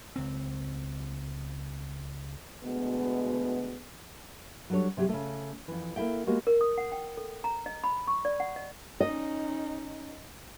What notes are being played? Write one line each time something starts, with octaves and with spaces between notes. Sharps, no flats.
C#2 C4
D2 B2 G#3 B3
F#3 G3 D4 A4 C#5
C3 F#3 G4 G#4
C#3 A3
F2 E3
A#3 E4 A4 E5 G5
G#3 A#3 B3 F#4 G4
A#4
D#6
F#5
G5
A4
A#5
D#5
B5
C#6
D5
F#5
D#5
C#4 D#4 D#5